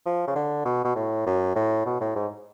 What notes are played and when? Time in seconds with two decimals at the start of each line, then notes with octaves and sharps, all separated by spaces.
0.06 F3
0.27 C#3
0.35 D3
0.65 B2
0.84 B2
0.95 A2
1.26 F#2
1.56 A2
1.86 B2
2.01 A2
2.16 G#2